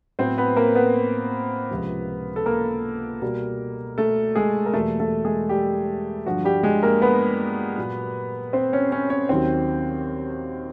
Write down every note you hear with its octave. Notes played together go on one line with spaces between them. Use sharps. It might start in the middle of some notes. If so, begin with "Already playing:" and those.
A2 F#3 B3 C4 C5
B3 B4
A#3 A#4
B3 B4
C#2 C3 F3
A4
A#3 A#4
B2 G3 A#3
A3 A4
G#3 G#4
A#4
E2 B2 G3 A3 A#3 A4
A3 A4
G#3 G#4
G3 G4
G2 D3 F3 F#4
G3 G4
G#3 G#4
A#3 A#4
B3 B4
A#2 F#3 A#3
C4 C5
C#4 C#5
C#4 C#5
C#4 C#5
D#2 D#3 F#3 C4 C5